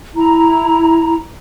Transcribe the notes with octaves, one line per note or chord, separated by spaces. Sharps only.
E4 A#5